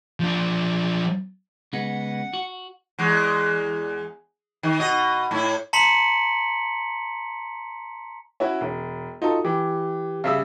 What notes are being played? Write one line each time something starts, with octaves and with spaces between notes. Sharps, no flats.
F3 D4
C#3 G#3 B3 F#5
F#4
E2 G#3
D#3
B2 D#5
A2 E4
A5 A#5 C6 B6 C#7 F#7
C#4 E4 F#4
E1
D#4 F4 F#4 A4
E3 G4
C#3 G3 G#4 E5 F5 E6